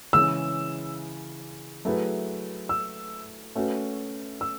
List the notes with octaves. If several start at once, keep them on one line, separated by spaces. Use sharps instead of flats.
C#3 E3 G#3 C#4 E6
F#3 A3 E4 G#4 B4
E6
A3 C#4 F#4 B4
E6